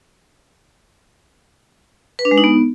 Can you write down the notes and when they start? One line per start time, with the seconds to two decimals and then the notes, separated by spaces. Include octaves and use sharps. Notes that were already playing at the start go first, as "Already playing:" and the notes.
2.19 B4
2.25 D4
2.31 G#3
2.38 D#4
2.44 B3